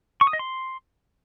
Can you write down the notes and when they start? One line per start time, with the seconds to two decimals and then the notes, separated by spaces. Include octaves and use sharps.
0.21 C#6
0.27 D#6
0.33 D#5
0.39 C6